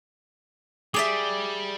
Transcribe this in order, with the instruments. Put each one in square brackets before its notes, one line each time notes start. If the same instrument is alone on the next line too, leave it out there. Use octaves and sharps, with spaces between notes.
[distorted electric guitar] G3 [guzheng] G#4 D5 E5 [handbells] D6